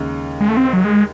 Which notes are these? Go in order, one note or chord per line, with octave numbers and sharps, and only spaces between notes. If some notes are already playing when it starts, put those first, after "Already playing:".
Already playing: D#2 C#3 G#3 D#4
G#3
A3
C4
F#3
G#3